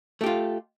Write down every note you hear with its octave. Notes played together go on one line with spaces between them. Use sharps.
A3 F4 G4